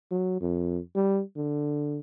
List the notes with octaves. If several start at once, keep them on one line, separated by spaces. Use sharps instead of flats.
F#3
F2
G3
D3